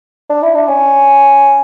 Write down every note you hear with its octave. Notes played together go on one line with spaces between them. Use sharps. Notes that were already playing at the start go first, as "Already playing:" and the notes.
D4
E4
D4
C#4